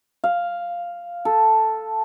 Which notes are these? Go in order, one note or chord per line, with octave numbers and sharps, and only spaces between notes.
F5
A4